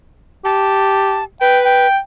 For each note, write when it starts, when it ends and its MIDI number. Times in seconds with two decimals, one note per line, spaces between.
0.45 1.23 67
0.45 1.24 81
1.41 1.87 71
1.41 1.59 79
1.65 1.98 79